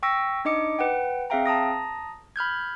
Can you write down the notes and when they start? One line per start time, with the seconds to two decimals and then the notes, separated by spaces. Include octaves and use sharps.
0.03 G5 C#6 E6 A#6 B6
0.45 D4 D#4 D#5 D6 C#7
0.79 B4 F#5 G5
1.30 C4 G#4 E5 F5 G5 A#5
1.46 A5 A#5 D#6 A#6
2.36 B5 F6 G6 G#6